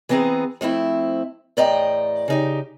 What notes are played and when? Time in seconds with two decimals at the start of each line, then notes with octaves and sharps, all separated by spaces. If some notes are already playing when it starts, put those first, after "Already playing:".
0.09 E3 B3 C4 G#4 A#5
0.61 F3 A3 C4 E4
1.57 E2 A2 D5 D#5 G5 A#5
2.28 C#3 D#4 G4